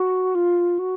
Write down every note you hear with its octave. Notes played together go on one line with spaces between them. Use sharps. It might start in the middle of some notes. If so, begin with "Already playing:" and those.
Already playing: F#4
F4
F#4